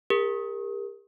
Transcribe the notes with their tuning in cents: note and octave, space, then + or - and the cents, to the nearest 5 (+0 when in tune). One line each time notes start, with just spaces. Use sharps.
G4 +45 A#4 +0